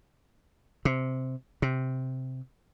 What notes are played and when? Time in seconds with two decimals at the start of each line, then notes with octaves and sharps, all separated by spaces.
0.85 C3
1.62 C3